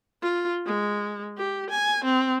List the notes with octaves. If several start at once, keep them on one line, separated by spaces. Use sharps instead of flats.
F4
G#3
G4
G#5
C4